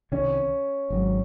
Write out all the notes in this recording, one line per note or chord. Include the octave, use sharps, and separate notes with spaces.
C2 C3 D#3 C#4
G#1 G#2 F#3